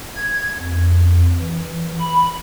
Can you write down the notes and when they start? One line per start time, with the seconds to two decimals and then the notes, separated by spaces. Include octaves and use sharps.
0.16 G#6
0.58 F2
1.39 E3
2.00 B5